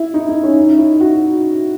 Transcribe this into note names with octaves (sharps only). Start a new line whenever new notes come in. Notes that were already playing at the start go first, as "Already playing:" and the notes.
Already playing: E4
D#4
D#4
C#4
D#4
E4
F#4